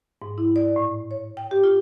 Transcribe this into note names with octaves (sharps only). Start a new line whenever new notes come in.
G#2
E4
D5
A2
C#5
G5
G4
F4